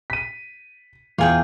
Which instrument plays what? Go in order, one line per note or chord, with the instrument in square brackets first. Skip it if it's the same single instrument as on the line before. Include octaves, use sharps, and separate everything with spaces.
[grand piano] B6 D#7
[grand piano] E2 [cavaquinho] F4 G#4 G5